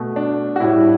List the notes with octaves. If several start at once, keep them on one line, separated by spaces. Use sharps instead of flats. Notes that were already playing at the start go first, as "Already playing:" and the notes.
Already playing: B2 A3
D4
F#4
A2 G3 E4